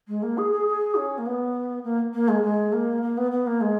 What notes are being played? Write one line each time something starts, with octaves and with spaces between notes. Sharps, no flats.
G#3
A#3
G#4
G#4
G#4
C#4
A#3
B3
A#3
A#3
G#3
G#3
A#3
A#3
B3
B3
A#3
G#3